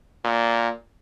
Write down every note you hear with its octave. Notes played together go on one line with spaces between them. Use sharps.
A#2